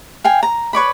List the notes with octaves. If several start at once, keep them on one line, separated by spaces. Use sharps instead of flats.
F5 G5 G#5
A#5
B4 C#5 D5 B5